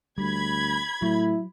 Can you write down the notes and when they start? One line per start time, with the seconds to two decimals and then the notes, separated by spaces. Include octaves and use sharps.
0.18 D2 G3 B5 G#6
1.02 A2 F#3 E4